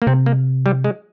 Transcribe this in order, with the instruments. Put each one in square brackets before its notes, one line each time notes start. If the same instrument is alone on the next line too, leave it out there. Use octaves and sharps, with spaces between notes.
[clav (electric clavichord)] A#3
[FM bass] C3 [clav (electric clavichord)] C4
[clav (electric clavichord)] A#3
G3
G#3